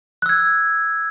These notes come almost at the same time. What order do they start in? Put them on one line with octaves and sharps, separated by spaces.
F#6 E6 G#6